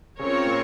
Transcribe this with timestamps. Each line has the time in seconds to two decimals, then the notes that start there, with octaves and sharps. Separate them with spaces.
0.19 C#3 C4 C#4 F4 A#4 C#5
0.44 A#2 A#3